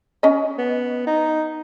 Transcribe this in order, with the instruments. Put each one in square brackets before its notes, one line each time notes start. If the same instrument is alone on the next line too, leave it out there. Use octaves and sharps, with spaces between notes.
[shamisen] C#4 D#5
[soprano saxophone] B3
D#4